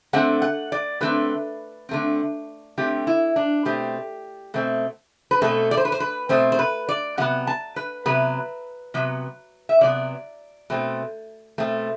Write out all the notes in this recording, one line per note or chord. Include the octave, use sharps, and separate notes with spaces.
D3 A3 C4 F#5
F#5
D5
D3 A3 C4 B4
D3 A3 C4
D3 A3 C4 G4
E4
D4
B2 A3 C4 G4
B2 A3 C4
B4
B2 A3 C4 A4
D5
C5
B4
C5
B4
B2 A3 C4 C5
C5
B4
D5
C3 F#3 B3 F#5
A5
B4
C3 F#3 B3 B4
C3 F#3 B3
E5
C3 F#3 B3 D5
B2 A3 C4
B2 A3 C4